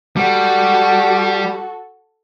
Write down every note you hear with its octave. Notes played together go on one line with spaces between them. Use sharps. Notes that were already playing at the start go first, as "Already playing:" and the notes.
G3 F#4 A4